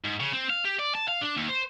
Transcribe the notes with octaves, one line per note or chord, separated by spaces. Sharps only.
G#2
C#3
C4
F5
G4
D5
A5
F5
D4
D#2
C5